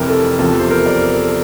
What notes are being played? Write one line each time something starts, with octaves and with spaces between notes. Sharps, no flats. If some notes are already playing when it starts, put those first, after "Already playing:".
Already playing: F1 F2 E3 G3 A#4
A4
E2 C3 F3 A4
C5
A#4
D5
A#4
A4